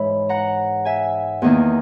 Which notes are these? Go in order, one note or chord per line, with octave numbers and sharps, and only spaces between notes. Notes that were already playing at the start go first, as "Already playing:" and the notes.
Already playing: G#2 E3 G#3 C#5 E5 B5
F#5 A#5
E5 G#5
E2 D#3 A#3